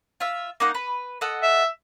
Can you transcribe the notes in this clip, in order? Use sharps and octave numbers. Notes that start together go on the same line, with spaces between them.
F4 E5
A#3 D#4 F#5
B4
A4 D#5 F#5
E5